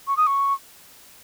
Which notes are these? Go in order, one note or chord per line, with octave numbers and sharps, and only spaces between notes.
C#6
D#6
C#6